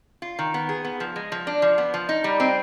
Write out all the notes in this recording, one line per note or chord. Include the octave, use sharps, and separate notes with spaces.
F4
D#3
B3
G#4
B3
F3
G#3
F3
D4
F3
B3
F3
D#4
G3
C4